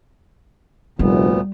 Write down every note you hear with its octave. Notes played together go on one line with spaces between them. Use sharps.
F1 D2 A#2 G3 B3